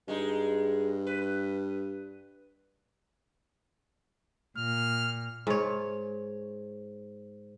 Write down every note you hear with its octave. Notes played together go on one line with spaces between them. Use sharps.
G2 G#3 D#4
B4
A#2 F6
G#2 C#5